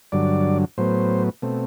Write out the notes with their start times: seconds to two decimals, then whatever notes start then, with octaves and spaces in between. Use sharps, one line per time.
0.12 G2 D3 F#3 D5
0.78 A2 F#3 B3 C5
1.42 B2 A3 C4